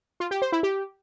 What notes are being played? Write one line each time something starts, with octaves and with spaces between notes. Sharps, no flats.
F4
G4
C5
E4
G4